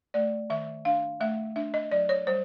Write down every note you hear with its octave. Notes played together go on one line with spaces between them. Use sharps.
A3 D5
D#3 E5
D4 F5
A3 E5
D4 E5
D#5
F#3 D5
C#5
G3 C5